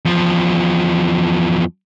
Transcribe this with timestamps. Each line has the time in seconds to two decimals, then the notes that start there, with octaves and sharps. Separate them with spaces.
0.05 E2 F3